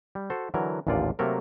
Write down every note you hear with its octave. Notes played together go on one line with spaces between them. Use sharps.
G3
F#4 A4 C5
D3 E3 F#3 A#4
A1 D#2 A#2 D3 F4 D5
C3 F#3 A3 A#3 A4 A#4